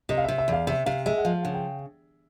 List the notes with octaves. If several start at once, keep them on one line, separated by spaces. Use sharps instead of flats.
C3 D#5
F5
C3 E5
E5
E2 F5
C3 E5
C3 F5
G#3 E5
F#5
F3 F5
C#3 F#5
G5